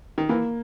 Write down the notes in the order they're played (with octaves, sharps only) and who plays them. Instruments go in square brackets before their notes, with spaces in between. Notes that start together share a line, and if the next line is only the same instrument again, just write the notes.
[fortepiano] D#3
[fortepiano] E3 [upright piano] A#3